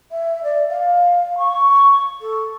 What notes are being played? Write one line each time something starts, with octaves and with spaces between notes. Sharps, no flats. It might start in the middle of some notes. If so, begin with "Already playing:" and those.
E5
D5
F5
C#6
A4